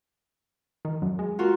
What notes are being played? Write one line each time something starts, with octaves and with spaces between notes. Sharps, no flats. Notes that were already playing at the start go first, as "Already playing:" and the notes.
D#3
F#2
G#3
F4 F#4 A#4